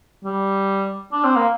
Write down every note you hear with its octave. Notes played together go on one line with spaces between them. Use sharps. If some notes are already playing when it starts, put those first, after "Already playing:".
G3
D4
C4
A#3